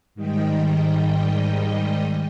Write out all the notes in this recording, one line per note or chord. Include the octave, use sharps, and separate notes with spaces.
G#2 D#3 G3 D#5 G5